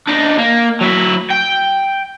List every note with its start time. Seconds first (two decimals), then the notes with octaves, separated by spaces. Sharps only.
0.08 D4 D#4
0.38 A#3
0.81 F#3 E4
1.31 G5